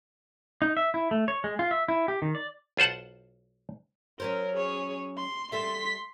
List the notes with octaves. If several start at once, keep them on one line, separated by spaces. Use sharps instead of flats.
D#4
E5
E4
A3
C#5
G#3
F4
E5
E4
G4
D#3
D5
B1 F4 C5 F#5 A5
F#3 C#4 A#4 C5
G#4 C#5
C6
G3 A4 E5 C6 B6